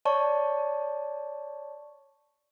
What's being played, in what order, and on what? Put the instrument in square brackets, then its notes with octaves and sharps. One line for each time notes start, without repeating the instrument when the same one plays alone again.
[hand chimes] C#5 D5 A5 C#6